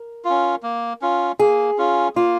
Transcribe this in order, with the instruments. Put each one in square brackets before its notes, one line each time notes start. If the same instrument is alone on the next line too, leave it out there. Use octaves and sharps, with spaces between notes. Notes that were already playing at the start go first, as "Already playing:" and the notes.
Already playing: [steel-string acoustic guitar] A#4
[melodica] C#4 F4
A#3
C#4 F4
[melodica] A#3 [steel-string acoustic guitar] G#4
[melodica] C#4 F4
[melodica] A#3 [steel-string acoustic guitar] F4